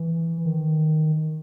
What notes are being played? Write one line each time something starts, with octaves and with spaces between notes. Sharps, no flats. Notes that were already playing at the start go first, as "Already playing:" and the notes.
Already playing: E3
D#3